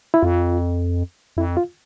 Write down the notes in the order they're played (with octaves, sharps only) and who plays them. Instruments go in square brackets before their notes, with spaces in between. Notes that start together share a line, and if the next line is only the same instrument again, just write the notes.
[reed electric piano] E4
[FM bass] F2 [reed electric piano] F4
[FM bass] F2 [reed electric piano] E4
[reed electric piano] F4